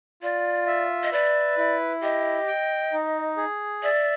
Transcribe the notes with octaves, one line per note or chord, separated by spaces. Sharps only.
F4 D5
E5
D#5
B4 D5
E4
G4 D#5
G5
D#4
G#4
D5 E5